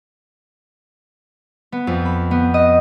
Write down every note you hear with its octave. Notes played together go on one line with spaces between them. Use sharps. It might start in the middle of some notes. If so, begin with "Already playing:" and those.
B3
F2
B5
B3
D#5